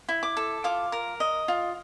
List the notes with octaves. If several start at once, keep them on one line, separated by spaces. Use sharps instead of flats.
E4
D6
A4
F4 D6
A#4
D#5
F4